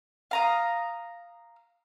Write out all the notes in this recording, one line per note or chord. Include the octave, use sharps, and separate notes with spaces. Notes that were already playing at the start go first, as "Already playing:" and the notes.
F5 A#5 D#6